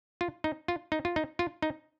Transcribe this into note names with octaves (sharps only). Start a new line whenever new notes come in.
F4
D#4
F4
D#4
F4
D#4
F4
D#4